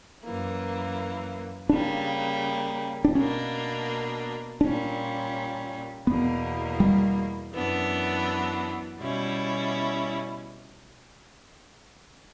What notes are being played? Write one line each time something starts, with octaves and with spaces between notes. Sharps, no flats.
F#2 E3 A#3
C#3 G3 A#3 D4
D4
B2 A#3 C#4 D4
A#2 G3 C#4 D4
E2 B2 A#3 B3
G3
F#2 E3 B3 D4
B2 G3 C#4 E4